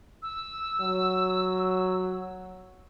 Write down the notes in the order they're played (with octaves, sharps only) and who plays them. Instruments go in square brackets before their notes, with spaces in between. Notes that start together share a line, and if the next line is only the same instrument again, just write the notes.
[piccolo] E6
[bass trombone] F#3